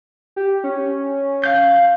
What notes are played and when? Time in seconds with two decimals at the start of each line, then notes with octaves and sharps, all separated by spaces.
0.36 G4
0.64 C#4
1.44 F5 G6